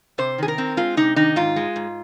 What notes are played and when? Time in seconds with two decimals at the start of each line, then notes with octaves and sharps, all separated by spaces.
0.18 C3 C5
0.38 D#3 G#4
0.48 A#4
0.58 C4
0.77 G#3 F4
0.97 C3 D#4
1.16 D#3 D#4
1.36 G#2 F4
1.56 G#3
1.76 G#2